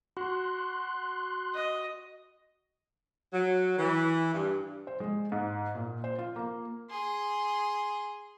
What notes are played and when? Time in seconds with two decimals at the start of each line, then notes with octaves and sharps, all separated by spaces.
0.17 F#4 C6 F#6
1.55 D#5
3.33 F#3
3.78 E3
4.34 G2
4.87 C5
5.00 G#3
5.32 G#2
5.75 A#2
6.04 C5
6.19 F4
6.36 A#3
6.90 G#4 C6